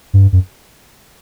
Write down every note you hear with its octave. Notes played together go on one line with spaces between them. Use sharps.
G2
F#2